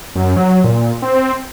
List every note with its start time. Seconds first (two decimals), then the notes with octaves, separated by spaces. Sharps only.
0.16 F#2
0.37 F#3
0.64 A#2
1.02 C4